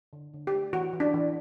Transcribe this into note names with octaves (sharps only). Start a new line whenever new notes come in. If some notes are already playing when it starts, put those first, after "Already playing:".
D3
D3
G4
A3
E3 F#4
E3
D4
E3